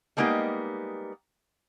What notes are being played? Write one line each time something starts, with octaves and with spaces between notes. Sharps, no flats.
G3 G#3 A#3 B3 D#4 G4